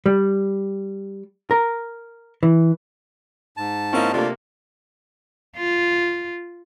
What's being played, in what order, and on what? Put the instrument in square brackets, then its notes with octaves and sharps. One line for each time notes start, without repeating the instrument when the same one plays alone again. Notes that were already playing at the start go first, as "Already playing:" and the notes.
[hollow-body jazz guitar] G3
A#4
E3
[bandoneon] G#2 A5
[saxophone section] A#3 C#4 E4 [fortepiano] C4 F4 D#5
[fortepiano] C3 A#3 [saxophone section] A3 D4 F4
[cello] F4